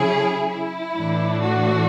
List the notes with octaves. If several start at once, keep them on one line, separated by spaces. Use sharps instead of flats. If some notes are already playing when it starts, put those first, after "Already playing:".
Already playing: C#3 F#3 C#4 E4 G#4
E4
A2 E3 A3 D4
F#4